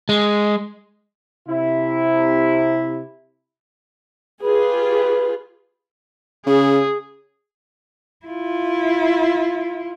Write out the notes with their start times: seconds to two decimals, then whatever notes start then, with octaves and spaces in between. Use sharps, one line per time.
0.09 G#3
1.49 C3 E4
4.43 F4 G4 G#4 B4
6.46 C#3 G#4
8.26 E4 F4